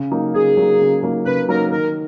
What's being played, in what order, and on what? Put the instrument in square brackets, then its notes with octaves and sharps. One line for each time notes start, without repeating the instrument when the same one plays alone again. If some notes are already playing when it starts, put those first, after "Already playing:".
Already playing: [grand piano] C#3
F#3 A#3 D#4
[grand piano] C#3 [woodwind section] G#4
[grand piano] F#3 A#3 D#4
C#3
F#3 A#3 D#4
[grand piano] C#3 [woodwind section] B4
[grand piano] F#3 A#3 D#4 [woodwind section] A#4
[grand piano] D#3 [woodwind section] A#4